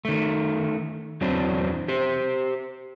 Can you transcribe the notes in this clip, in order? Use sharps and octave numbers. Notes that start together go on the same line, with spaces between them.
D#3 A3
E2 E3 F#3 C4 D4
G4 C5